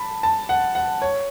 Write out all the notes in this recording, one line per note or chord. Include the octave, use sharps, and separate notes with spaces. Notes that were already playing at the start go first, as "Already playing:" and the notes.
Already playing: A5 B5
A5
F#5
F#5
C#5